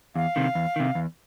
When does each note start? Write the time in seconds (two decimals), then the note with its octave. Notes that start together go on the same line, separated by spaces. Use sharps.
0.16 E2 F5
0.36 C3 D#3
0.55 E2
0.76 C3 D#3
0.95 E2